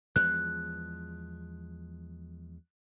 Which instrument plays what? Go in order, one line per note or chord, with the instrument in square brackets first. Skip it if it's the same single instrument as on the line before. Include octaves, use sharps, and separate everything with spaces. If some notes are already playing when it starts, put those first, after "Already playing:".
[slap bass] E2 F3 G#3 [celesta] F#6